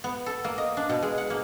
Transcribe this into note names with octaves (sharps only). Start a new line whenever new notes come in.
B3
A4
A#3
D#5
D4
B2
G#3
F#5
A#3